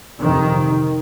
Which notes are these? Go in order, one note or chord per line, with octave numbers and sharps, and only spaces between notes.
F2 C3 D#3